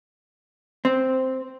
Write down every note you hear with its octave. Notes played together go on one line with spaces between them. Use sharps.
C4